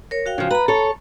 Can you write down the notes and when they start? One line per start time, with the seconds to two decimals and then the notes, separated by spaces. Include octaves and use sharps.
0.11 A#4 C#5
0.26 F#4 F5 G5
0.38 C#3 F3
0.51 B4 A#5 B5
0.68 A4 C#5